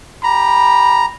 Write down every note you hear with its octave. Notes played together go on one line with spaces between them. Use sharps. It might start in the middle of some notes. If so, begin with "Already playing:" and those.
G4 A#5 B5